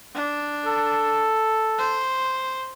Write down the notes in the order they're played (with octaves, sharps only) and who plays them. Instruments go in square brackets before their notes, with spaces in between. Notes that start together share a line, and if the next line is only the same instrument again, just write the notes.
[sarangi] D4
[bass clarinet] A4
[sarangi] C5